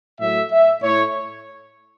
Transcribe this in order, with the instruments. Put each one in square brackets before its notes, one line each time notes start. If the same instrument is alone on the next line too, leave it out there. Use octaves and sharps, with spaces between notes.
[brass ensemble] A2 F#3 A3 E5
E5
A2 A3 C#5